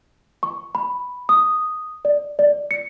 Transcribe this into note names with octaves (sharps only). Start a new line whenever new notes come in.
C#6
B5
D#6
D5
D5
C#7